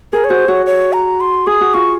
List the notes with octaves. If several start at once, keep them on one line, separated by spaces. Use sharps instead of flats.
G#4 A#4
C#5
F#4 C5
F#4 C#5
C#5
A#5
C6
G#4 D#6
F#4
F4 C#6